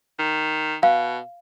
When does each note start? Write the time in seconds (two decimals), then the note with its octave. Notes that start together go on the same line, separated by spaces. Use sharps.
0.19 D#3
0.83 B2 F5